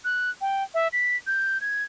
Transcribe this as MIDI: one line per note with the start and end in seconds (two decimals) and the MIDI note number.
0.05 0.30 90
0.41 0.63 79
0.74 0.88 76
0.93 1.17 95
1.27 1.60 91
1.61 1.83 92